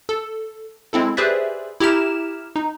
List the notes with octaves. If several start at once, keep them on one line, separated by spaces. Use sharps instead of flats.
A4
G#3 C4 E4 A4
G4 G#4 B4 C5 D5 E5
E4 G4 A#5 F6 E7
D#4